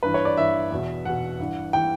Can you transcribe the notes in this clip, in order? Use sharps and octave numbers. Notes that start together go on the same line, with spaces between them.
G2 E3 B4
C#5
D5
G2 E3 E5
E2 B2
E2 B2 F#5
G2 E3
E3 G5